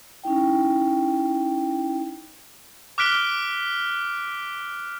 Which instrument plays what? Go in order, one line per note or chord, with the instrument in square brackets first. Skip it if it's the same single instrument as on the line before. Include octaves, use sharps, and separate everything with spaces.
[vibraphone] C#4 D#4 E4 G5
[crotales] D6 F6 F#6 B6 D7 G7